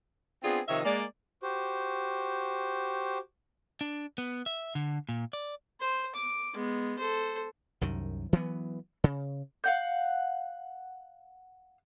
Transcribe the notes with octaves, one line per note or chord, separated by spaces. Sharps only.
B3 C4 D4 F4 G#4
C3 D#3 F3 C#5 D#5 E5
G#3 A#3 D5
F#4 G4 C5
D4
B3
E5
D3
A#2
D5
C5
D6
G#3 B3
A4 C5
C2 F#2 D#3
E3 F#3 G#3 B3
C#3
F5 F#5 G6